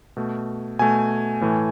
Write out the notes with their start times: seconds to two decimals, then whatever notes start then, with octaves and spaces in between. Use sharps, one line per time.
0.17 B2 A3
0.79 B2 A3 G#5
1.41 A2 E3 A3